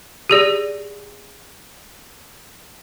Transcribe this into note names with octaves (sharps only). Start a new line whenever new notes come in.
G4 G#4 D5